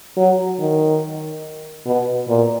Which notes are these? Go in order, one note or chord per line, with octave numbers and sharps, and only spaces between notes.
F#3
D#3
B2
A#2